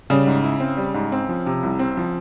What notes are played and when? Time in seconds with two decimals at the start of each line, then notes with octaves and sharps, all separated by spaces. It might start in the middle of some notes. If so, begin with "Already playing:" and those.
0.10 C#3 G3
0.27 G#2
0.44 E4
0.60 C4
0.77 G3
0.94 G#2
1.12 C4
1.29 F3
1.46 C3
1.63 C2
1.79 C4
1.97 F3